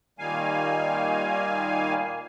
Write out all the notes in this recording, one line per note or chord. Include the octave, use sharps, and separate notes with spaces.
A#2 D#3 G3 A#3 F5 G#5